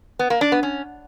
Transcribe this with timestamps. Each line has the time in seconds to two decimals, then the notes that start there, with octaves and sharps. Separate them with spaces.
0.19 B3
0.30 A#3
0.41 D4
0.52 B3
0.63 C#4